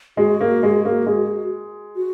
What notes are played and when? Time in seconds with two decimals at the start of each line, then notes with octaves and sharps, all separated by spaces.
0.17 G#3 F#4
0.41 A#3
0.63 G#3
0.85 A#3
1.06 G#3
1.96 F#4